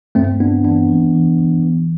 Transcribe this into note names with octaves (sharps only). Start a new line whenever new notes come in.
G2 A3 C4
G2 B3 D4
E3 B3 D4
E3
E3
E3
E3